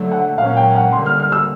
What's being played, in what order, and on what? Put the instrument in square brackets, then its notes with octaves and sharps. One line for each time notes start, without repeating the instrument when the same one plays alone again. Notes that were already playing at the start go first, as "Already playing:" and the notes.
Already playing: [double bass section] D3 F#3 A3
[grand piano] F#5
[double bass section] A#2 F#3 A#3 C#4 [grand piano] F5
[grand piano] G5
F#5
[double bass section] D3 G3 A#3 [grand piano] C6
[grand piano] F6
F6
E6